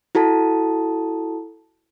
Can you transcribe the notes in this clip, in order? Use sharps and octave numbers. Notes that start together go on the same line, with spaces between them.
E4 F#4 A4 A5